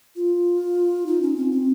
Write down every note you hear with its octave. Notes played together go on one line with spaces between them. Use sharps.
F4
D#4
C#4
C4
C4